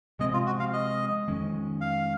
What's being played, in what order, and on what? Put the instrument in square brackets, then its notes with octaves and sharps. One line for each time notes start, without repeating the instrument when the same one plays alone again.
[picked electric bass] C3 F3 G#3 C4 [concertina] D#5
[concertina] F4
F#4
F5
D#5
[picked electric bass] F2 D#3 G#3 C#4
[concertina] F5